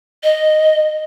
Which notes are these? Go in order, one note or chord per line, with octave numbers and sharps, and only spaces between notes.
D#5